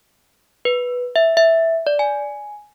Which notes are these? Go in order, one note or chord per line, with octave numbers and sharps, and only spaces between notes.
B4
E5
E5
D5
G#5